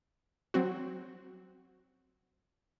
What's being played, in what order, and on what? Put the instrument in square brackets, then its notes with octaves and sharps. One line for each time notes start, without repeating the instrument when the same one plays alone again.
[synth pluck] F#3 C4 F#4